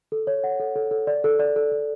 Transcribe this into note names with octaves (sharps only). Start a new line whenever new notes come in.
A4
C#5
F#5
A4
A4
A4
D5
A4
D5
A4
A4